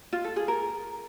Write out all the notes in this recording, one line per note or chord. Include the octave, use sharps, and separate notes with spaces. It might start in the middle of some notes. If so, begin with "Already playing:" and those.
F4
A4
G#4
A#4